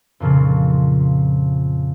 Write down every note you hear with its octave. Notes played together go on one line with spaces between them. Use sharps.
F2 A#2 C#3 F3